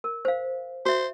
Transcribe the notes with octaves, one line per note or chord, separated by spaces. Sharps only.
A#4
C5 F5
F#4 C5 E5